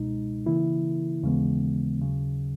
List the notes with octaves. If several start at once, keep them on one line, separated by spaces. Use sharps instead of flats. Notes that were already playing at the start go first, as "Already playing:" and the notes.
Already playing: C#2 B2 G#3 D#4
C#3 E3 A#3 E4
D#2 C#3 E3 G#3 B3
D#2 C#3 F#3